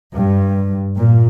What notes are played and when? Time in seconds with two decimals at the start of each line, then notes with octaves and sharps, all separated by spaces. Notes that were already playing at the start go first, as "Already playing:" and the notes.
0.15 G2
0.98 A#2